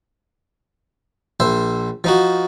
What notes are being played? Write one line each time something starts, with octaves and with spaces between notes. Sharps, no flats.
A#1 C5 E5
F3 D#4 F#4